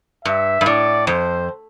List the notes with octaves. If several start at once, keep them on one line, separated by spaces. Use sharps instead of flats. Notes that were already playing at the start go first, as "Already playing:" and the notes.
G2 E5
G2
A2 D5
F2 C5